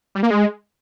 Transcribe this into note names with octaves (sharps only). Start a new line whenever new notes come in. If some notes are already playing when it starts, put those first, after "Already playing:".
G3
A#3
G#3